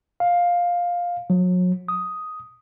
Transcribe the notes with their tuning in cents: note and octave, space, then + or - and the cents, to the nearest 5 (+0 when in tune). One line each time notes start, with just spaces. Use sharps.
F5 +10
F#3 -35
D#6 +5